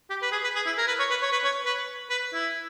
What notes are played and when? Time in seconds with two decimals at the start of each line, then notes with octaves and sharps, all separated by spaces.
0.10 G4
0.22 B4
0.32 G#4
0.44 B4
0.55 G#4
0.66 E4
0.78 A#4
0.88 B4
0.99 C#5
1.10 B4
1.22 C#5
1.32 B4
1.44 C#5
1.66 B4
2.10 B4
2.33 E4